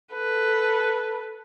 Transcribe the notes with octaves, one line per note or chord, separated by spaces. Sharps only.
A4 B4